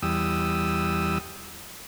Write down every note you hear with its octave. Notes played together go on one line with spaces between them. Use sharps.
E2 G3 D#6 E6